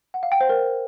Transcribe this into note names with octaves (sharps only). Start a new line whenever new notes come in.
F#5
F5
G5
C5
A#4